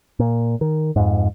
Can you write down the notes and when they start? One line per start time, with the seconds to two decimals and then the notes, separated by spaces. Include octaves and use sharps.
0.19 A#2
0.61 D#3
0.96 F2 G#2